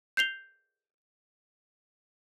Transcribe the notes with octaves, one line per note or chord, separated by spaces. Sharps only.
G6 C7 F7 G7